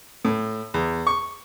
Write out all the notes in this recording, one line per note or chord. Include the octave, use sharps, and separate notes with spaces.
A2
E2
C#6